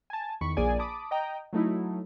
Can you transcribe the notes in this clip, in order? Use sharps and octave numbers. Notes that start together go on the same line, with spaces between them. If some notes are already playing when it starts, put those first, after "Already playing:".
G#5 A5
E2 D#3 B5 C#6
A#1 A#3 G#4 D5 G#5
A5 B5 D6 D#6
D#5 G5 A#5
F#3 A3 D#4 E4